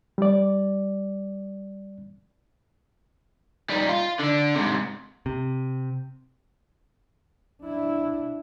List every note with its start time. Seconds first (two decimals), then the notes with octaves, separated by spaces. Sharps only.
0.18 G3 D5
3.70 G3 D#4
3.89 F4
4.19 D3 D4
4.55 G#2 C3
5.26 C3
7.62 D4 E4